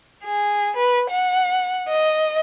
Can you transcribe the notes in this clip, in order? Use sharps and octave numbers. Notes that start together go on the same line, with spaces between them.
G#4
B4
F#5
D#5